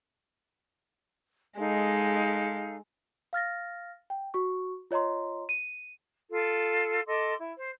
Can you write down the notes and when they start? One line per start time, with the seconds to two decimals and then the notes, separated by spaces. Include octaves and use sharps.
1.59 G#3 D#4 A4 F5
3.33 F5 F6 A6 A#6
4.10 G5
4.34 F#4 C#6
4.91 F4 C#5 D#5 A#5 C6
5.49 D#7
6.29 F4 A4
7.06 A4 D#5 C6 D6
7.39 E4
7.57 C5